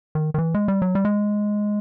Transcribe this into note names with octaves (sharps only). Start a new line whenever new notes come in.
D#3
D#3
E3
G#3
G3
F#3
G3
G#3